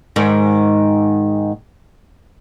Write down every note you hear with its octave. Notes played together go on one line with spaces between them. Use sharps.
G#2 D#3